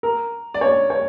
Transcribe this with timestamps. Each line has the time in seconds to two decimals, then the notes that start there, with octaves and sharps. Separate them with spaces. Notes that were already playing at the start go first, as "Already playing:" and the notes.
0.03 A#4
0.54 D5
0.61 C#5
0.90 C#5